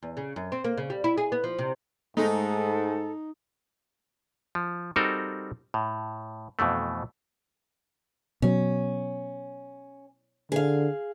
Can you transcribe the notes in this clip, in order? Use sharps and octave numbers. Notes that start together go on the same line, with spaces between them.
E2
C#3
F#2
C4
A#3
C#3
G3
E4
G#4
B3
F3
C3
G#2 G#3 A3 D#4 A4
F3
G3 C4 D#4 F#4 A4 A#4
A2
F2 B2 E3 A3
B2 F#3 C#4
D3 G#4 F5